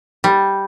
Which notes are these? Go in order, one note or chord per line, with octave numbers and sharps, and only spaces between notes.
G3